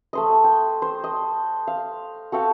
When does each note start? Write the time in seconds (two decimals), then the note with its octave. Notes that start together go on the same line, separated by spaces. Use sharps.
0.13 A3 C5 D#5
0.44 G5
0.82 C5
1.04 D#5
1.67 F5
2.32 F#4 A4 F5 G5